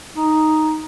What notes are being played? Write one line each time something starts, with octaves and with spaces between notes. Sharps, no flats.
D#4